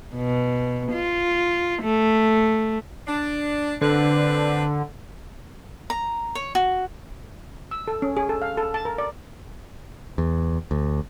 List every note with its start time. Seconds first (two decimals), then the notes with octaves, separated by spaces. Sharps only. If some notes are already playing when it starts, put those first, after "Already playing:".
0.15 B2
0.92 F4
1.83 A3
3.07 D4
3.81 D3 C4 D4 B4
5.90 A#5
6.35 C#5
6.55 F#4
7.71 E6
7.88 A4
8.02 C#4
8.17 G#4
8.29 A4
8.42 F5
8.57 A4
8.74 A5
8.85 A#4
8.98 D5
10.18 E2
10.71 D2